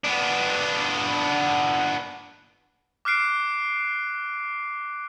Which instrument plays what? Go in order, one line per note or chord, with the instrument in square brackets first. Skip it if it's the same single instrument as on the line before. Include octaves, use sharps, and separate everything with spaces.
[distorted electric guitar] B3 D4
[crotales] D6 F6 F#6 C7 D7